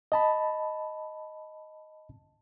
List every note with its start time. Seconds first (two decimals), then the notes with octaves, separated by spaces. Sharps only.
0.12 D#5 A5 B5